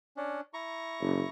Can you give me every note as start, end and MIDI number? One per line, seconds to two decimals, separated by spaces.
0.17 0.41 61
0.17 0.41 62
0.54 1.30 64
0.54 1.30 82
0.54 1.30 85
1.01 1.24 30